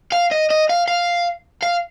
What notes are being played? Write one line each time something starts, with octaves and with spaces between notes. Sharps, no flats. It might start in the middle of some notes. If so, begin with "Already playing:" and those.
F5
D#5
D#5
F5
F5
F5